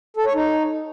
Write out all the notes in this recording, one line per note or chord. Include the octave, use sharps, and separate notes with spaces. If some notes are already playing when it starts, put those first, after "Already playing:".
A4
C#5
D#4